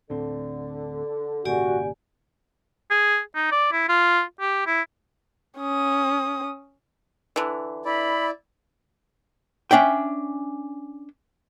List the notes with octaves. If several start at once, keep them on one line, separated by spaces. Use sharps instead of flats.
D2 A2 D3 C4
G#1 A#2 C#3 F#4 G4 D5 G#5
G#4
D#4
D5
E4
F4
G4
E4
C#4 D#6
D3 E3
E4 D5 B5
C#4 D4 E5 G5